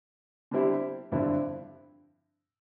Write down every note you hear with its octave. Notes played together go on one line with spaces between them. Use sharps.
D3 G3 C4 E4 G4
G2 D3 F3 C4 E4